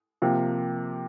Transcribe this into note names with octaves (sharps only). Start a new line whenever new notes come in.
C3 F3 A#3